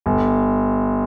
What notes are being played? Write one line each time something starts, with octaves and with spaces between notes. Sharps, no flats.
G1